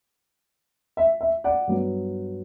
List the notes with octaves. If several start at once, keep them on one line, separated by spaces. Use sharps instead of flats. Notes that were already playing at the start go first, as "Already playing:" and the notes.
E5
E5
D5 F#5
G2 F#3 B3